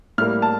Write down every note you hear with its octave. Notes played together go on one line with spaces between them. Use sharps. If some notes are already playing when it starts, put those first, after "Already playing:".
A2 G3 A#3 F6
A5